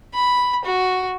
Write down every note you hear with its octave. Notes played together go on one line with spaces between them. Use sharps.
B5
F#4